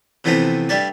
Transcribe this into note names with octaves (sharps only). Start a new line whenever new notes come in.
C3 E3 F3 A3 B3 C4
G2 G3 A3 D5